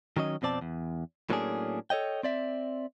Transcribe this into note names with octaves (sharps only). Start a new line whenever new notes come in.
D#3 F#3 C#4 D#5
F2 B2 C4 D5 A5
E2
A2 F#3 A#3 C#4 D4 G#4
A4 C#5 D#5 G5
C4 D5 E5